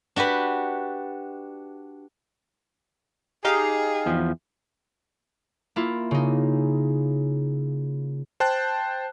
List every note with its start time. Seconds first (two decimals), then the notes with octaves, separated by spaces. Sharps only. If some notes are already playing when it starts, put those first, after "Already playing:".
0.16 D4 F#4 G4 B4
3.45 D#4 G4 G#4 F5
4.06 E2 F3
5.76 A#3 E4 F4
6.11 C#3 D#4
8.40 C5 G5 A5 F#6